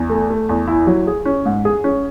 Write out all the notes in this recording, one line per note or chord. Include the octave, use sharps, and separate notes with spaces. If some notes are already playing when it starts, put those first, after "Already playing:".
Already playing: E2
A3
A3
E2
E4
F#3
G#4
C#4
G#2
G#4
C#4